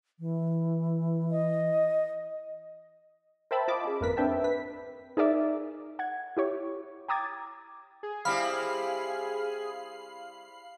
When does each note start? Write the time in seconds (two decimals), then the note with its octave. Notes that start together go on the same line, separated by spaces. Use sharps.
0.19 E3
1.31 D#5
3.51 A#4 C5 E5 G5 A5 B5
3.68 F4 D#5 A5 B5 D6
3.85 C#4 G#4
4.01 G#1 F2 A#3 A#4 B4 B6
4.17 C4 D4 B4 E5 G5 A5
4.44 B4 B6
5.17 D#4 G#4 A#4 D5 E5
5.99 F#5 G#6
6.37 E4 G4 C#5
7.08 G5 A#5 D6 D#6 G#6 A6
8.03 G#4
8.25 G3 C4 E4 F5 B5 F6